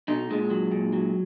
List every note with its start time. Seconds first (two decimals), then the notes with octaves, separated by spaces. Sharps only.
0.08 B2 D#4
0.30 A#2 G#3
0.50 F#3
0.72 A#2
0.93 F#3